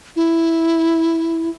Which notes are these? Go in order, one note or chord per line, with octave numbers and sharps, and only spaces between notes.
E4